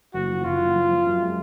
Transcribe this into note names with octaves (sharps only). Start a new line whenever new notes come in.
F#1 F#4
F3
F#1 F4
F#1
F3
F3
F#2
G#3